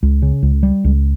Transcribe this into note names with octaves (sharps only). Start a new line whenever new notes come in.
C#2
C#3
C#2
G3
C#2